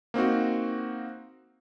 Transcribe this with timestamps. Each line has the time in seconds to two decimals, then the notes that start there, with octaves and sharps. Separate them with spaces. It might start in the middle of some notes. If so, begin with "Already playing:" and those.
0.14 A#3 C4 D#4 F#4